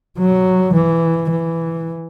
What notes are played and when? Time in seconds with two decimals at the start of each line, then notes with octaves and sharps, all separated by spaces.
0.18 F#3
0.75 E3
1.31 E3